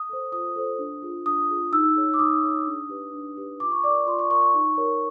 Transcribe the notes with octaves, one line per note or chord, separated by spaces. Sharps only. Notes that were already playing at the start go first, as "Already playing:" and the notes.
Already playing: D#6
A4 C5
F4 D#6
A4 C5
D4
F4 G#4
D4 D#6
F4 G#4
D#4 E6
G#4 C#5
D6
D#4 D#6
G#4 C#5
D4
G4 B4
D4
G4 B4
F4 D6
C#6
A#4 D5 D6
F4 C6
C#6
A#4 D5 C#6
C#6
D#4
G4 A#4 C#5